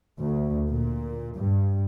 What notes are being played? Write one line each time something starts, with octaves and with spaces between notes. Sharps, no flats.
D2
A#2
G2